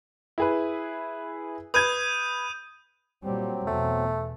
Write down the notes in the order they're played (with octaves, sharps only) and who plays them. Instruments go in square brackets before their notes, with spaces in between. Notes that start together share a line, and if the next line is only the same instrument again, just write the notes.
[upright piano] E4 G#4 B4
[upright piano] B4 G#6 [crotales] D#6 G6 D#7
[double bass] A#2 G3 [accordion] F#3 C4
[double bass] E2 B2 [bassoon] A3